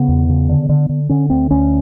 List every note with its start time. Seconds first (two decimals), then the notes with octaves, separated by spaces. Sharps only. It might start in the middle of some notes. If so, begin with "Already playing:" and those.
Already playing: C#3 B3
0.08 E2
0.29 C#3
0.49 D3
0.69 D3
0.89 D3
1.09 D3 C#4
1.30 D2 C4
1.51 D2 C#4